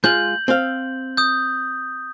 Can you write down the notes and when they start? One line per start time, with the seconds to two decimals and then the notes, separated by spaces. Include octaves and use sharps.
0.04 G#3 F4 G6 F#7
0.48 C4 F5
1.17 D#6 G6